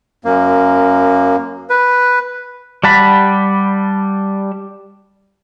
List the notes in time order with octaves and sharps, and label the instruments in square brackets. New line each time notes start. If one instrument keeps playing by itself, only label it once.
[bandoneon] F#2 A#3
B4
[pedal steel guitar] G3 F#5 A5 B5